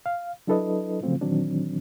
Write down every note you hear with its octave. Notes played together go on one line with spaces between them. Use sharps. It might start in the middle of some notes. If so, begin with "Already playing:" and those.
F5
F#3 D4 E4 A4 B4 D#5
C#3 F3 F#3 A3 C4 F4
A#2 D#3 E3 F#3 C4 D4